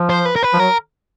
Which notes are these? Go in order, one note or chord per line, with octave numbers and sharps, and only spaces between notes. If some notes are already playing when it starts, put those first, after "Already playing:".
Already playing: F3
C5
B4
A#4
B4
F3
F#3 A#4